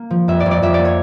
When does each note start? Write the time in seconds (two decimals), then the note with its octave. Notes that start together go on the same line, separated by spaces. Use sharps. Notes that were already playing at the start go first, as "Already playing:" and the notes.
Already playing: A#3
0.10 F3
0.28 F2 E5
0.40 D5
0.46 F2
0.51 D5
0.62 F2 E5
0.74 D5
0.79 A#3
0.85 C#5